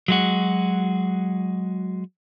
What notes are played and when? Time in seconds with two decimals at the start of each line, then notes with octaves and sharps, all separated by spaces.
0.08 F#3 G#3 F#4